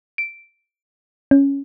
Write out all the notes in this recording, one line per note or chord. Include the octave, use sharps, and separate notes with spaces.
D7
C#4